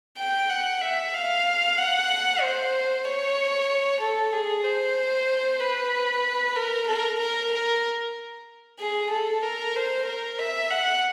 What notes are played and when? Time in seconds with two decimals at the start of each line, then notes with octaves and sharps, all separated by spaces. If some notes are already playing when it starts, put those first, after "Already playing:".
0.18 G5
0.50 F#5
0.81 E5
1.13 F5
1.77 F#5
2.41 C5
3.05 C#5
4.01 A4
4.33 G#4
4.64 C5
5.60 B4
6.56 A#4
6.88 A#4
7.19 A#4
7.52 A#4
8.79 G#4
9.11 A4
9.43 A#4
9.75 C5
10.06 A#4
10.39 E5
10.70 F#5